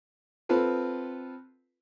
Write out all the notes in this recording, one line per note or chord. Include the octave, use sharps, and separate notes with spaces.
C4 F4 A4 B4